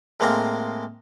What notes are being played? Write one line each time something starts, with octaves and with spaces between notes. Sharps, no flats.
A2 G#3 A#3 C4 F5 A#5